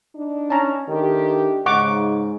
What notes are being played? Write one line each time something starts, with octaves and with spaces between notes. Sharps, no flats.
D4 D#4
C#4 A5 A#5
D#3 A3 D4 G4
G#2 C#3 D#4 F#5 C#6 D6